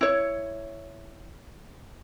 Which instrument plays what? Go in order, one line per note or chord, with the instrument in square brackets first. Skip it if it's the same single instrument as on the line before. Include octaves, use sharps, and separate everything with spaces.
[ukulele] E4 C#5